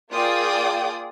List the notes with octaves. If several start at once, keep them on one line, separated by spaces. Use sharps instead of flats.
A#3 F4 G#4 D5 G5 D#6